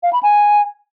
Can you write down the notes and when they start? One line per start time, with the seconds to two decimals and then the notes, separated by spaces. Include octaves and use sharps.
0.03 F5
0.13 B5
0.23 G#5